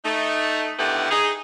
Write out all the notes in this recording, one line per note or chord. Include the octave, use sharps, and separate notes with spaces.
A3 D#4
D3 D#3 A3 B3 E4 G4
D#4 G#4